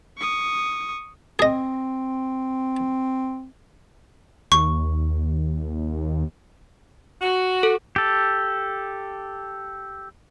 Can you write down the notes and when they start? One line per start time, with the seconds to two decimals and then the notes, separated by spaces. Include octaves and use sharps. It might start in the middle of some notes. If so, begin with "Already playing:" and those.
0.18 C#6 D#6
1.39 C4 G#4 D#5
4.52 D#2 C#6
7.21 F#4
7.63 A4
7.96 G4 A4